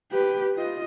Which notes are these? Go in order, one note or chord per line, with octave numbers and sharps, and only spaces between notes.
G4 B4
F4 D#5